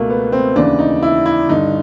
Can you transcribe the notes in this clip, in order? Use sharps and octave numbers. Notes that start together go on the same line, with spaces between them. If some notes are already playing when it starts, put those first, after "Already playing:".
Already playing: C#2 B2 A3 A#3
B3
C4
D#2 C#3 E3 D4
D#4
E4
E4
G2 D3 D#4